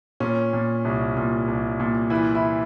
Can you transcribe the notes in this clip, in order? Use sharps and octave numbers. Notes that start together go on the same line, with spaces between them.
A#2 C#4
A#2
C2
A#2
C2
A#2
E3 E4
E4